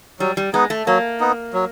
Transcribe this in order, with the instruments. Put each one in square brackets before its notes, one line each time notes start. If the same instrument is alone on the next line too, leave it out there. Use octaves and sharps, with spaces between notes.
[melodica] F#3 [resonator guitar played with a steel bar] G3
[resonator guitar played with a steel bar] G3
[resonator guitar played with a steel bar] G#3 [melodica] B3 D#4
[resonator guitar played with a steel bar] A3
[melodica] F#3 [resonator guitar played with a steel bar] A#3
[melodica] B3 D#4
F#3